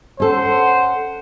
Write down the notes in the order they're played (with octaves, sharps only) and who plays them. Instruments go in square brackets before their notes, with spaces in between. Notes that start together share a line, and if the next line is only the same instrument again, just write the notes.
[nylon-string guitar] C#4 A4 [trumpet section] C5 F#5